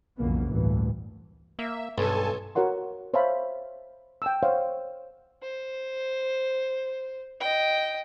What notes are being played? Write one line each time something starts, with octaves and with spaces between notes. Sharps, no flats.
B1 F2 C#3 E3 A#3 B3
A1 D2 G2 E3
A#3 E5
B1 G2 A4 G#5 A5
F#4 A#4 C#5 F#5 C6
C5 C#5 E5 F5 A5 B5
G5 A5 E6
C5 C#5 F5 F#5
C5
D#5 G5